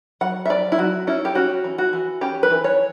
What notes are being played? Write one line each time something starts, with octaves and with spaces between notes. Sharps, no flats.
F#3 F#5
E5
F#3 D5
E4
F#3 F#4
C#4 E4
G4
C#4 F#4
E3
F#4
E3
C#4 G4
B4
E3
C#5